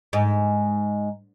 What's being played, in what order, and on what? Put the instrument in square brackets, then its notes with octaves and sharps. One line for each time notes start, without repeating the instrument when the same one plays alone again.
[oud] G#2